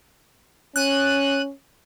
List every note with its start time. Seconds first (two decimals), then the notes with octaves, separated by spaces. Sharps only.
0.76 C#4 F#6 D#7